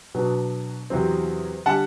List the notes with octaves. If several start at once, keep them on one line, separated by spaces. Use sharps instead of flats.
B2 F#3 B3 D4
E2 C3 F#3 C4
D3 G3 F#5 A5